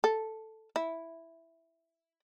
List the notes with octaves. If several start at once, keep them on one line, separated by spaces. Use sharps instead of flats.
A4
E4